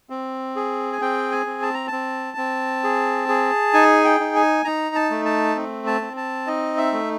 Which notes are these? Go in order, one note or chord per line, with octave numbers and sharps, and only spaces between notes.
C4
G#4
G#5
C4 G5
G#5
C4
A5
A#5
C4 A5
C4
G#4
G#4
D#4 G#5
G5
D#4
G#5
D#4 A#5
A5
A3
A5
C4
A5
C4
A5
D#4 D#5
E5
A3